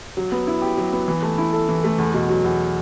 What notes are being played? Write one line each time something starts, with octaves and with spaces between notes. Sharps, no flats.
F#3
B3
E4
G4
F#3
B3
E3
A3
E4
A4
E3
A3
E2
B2
F#3
E2